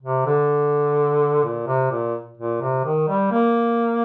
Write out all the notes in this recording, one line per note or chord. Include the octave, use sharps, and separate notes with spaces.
C3
D3
A#2
C3
A#2
A#2
C3
D#3
G3
A#3